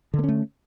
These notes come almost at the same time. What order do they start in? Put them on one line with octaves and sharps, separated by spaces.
D3 A#3 C#4 A3